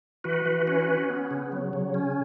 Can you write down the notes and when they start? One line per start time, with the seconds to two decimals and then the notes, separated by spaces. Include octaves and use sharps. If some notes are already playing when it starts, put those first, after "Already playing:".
0.24 E3 F#4 B4
0.46 E3
0.67 C#4 F#4 B4
0.88 C#4
1.09 B3
1.31 C#3
1.52 F#3
1.73 C#3
1.94 C#4